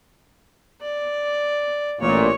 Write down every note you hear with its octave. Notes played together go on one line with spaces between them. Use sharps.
D5
A1 A#2 C#5